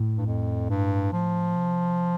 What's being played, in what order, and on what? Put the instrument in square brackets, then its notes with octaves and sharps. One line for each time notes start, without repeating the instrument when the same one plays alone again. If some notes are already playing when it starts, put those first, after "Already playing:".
Already playing: [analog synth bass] A2
[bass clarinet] G2
F2
G2
F3
[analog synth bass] C3